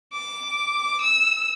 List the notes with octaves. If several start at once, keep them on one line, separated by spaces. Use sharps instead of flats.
D6
E6